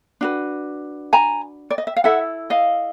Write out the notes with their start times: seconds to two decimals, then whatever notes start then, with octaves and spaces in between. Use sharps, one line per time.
0.21 D4 F#4 B4
1.13 G#5 A#5
1.70 D5
1.78 D#5
1.87 E5
1.96 F5
2.04 E4 A4 E5 F#5
2.50 D#5 F5